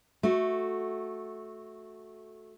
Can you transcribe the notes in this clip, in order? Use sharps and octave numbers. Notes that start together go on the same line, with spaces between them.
A3 F#4